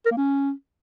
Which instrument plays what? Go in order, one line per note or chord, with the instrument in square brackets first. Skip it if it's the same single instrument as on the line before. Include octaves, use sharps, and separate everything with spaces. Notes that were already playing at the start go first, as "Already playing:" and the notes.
[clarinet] A#4
A#3
C#4